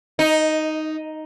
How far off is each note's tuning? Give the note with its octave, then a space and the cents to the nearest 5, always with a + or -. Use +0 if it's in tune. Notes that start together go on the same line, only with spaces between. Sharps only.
D#4 +0